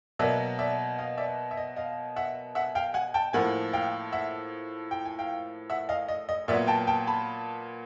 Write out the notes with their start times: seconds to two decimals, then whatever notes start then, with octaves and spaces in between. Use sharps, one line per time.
0.19 B2 F#3 A#3 D5 E5
0.59 D5 E5
0.98 D#5 F5
1.17 D5 E5
1.51 E5
1.57 D#5
1.76 D#5 F5
2.16 E5 F#5
2.55 E5 F#5
2.75 F5 G5
2.94 F#5 G#5
3.14 G5 A5
3.33 A2 F3 A#3 F#5 G#5
3.73 F5 G5
4.12 E5 F#5
4.91 G5
5.06 G#5
5.19 F5 G5
5.70 E5 F#5
5.89 D#5 F5
6.08 D#5
6.29 D#5
6.48 A#2 F#3 B3 D5 E5
6.67 G5 A5
6.87 G5 A5
7.07 A5 B5